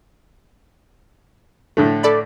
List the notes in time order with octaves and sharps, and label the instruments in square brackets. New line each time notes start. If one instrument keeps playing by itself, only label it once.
[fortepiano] A2 D3 A3
[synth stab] A4 D5 B5